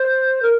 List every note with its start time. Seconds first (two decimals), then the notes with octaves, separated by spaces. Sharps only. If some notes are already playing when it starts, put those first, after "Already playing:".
Already playing: C5
0.42 A#4